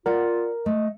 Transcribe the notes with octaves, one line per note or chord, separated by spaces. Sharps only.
F4 A#4 D5 F#5
A3 D#5